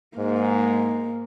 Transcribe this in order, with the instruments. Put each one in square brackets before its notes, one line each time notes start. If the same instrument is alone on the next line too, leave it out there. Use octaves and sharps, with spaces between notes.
[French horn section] G#2 [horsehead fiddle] A#3